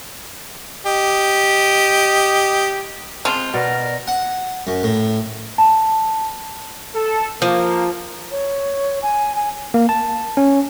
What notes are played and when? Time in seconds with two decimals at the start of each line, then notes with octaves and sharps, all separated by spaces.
0.86 G4 D#5
3.25 G#3 C4 F4 A5
3.54 B2 A#4 D5
4.07 F#5
4.67 F#2
4.83 A2
5.58 A5
6.94 A4
7.42 F3 A#3
8.31 C#5
9.02 G#5
9.36 G#5
9.74 A#3
9.89 A5
10.37 C#4